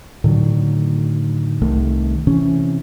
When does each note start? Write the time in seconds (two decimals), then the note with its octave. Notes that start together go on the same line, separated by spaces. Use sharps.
0.24 A2 D3 D#3 F#3
1.62 C2 D#3 A3
2.27 C3 E3 C#4